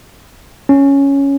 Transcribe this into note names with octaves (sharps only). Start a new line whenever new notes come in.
C#4